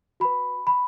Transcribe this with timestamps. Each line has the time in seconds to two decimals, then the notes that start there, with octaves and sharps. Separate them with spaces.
0.20 F#4 B4 B5
0.67 B5